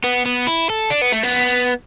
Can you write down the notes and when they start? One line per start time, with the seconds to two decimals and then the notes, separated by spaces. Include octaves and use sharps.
0.04 B3
0.26 B3
0.47 E4
0.70 A4
0.90 D4
1.02 B3
1.12 A3
1.24 B3